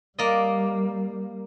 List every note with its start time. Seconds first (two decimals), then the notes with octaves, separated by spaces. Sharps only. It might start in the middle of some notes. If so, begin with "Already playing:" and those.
0.19 G3 A#3 D5 D#5